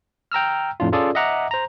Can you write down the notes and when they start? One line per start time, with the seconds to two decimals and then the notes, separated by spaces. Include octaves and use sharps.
0.32 G5 A#5 E6 F6
0.80 F2 A2 D4 F4
0.92 C#4 F4 G#4 A4 D5
1.15 D#5 E5 F#5 A#5 D6
1.51 C5 A#5